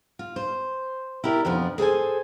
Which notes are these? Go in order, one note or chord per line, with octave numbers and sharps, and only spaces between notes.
F4
C5
E4 G4 A#4 D5
F2 B2 F3 D4
G#4 A4 C5 G#5